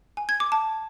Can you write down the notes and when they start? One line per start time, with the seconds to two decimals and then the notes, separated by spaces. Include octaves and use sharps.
0.17 G#5
0.29 G#6
0.40 D6
0.52 A5